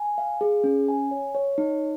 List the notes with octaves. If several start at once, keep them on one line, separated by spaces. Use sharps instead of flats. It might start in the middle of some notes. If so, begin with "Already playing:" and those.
Already playing: G#5
F5
G#4
C#4
G#5
C#5
C#5
D#4